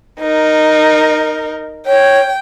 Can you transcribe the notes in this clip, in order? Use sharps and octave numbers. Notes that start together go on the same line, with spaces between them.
D#4 A#4
C#5 G5